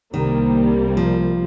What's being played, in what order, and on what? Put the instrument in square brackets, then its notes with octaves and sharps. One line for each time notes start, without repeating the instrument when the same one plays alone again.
[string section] C2 C3 G3 A#3 [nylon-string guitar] D#3
[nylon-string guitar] F3